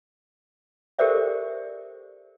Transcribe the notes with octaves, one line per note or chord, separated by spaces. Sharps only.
G4 A4 A#4 C5 D5 E5